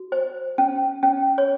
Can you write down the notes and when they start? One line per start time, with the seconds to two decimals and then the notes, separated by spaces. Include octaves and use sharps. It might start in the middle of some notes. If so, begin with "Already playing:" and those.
Already playing: F#4
0.12 C5
0.58 C#4
1.03 C#4
1.38 C#5